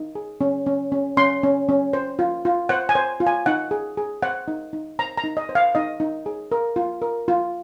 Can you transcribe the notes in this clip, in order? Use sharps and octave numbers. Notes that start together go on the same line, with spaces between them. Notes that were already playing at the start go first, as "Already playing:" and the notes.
Already playing: D#4
G#4
C#4
C#4
C#4
C#4 C6
C#4
C#4
C5
F4
F4
C5 F#5
G#5
C5
F4
G#5
D#4 F#5
G#4
G#4
C5 F#5
D#4
D#4
C5 A#5
A#5
D#4
D#5
C5
F5
D#4 D#5
D#4
G#4
A#4
F4
A#4
F4